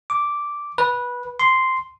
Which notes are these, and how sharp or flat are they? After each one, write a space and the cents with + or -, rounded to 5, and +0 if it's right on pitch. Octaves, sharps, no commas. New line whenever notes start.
D6 -5
B4 -15
C6 -5